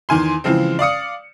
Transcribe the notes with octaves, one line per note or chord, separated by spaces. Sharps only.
E2 D#3 G#5 C6
C#3 E3 F3 G#3 C4
D5 F5 D#6 C#7